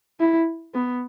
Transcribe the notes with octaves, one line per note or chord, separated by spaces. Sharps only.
E4
B3